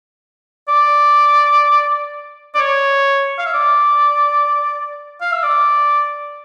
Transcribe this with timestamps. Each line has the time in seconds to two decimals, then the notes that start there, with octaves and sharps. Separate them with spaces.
0.68 D5
2.55 D5
2.58 C#5
3.39 F5
3.46 E5
3.54 D5
5.21 F5
5.32 E5
5.43 D5